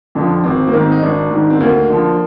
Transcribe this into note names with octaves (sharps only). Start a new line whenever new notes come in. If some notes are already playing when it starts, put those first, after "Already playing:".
F2 D3 F3
G#1 C4
A#3
G#2 D#3 C4
D#4
G#1 D4
G#2 D#3
C4
D2 A#3
D3 F3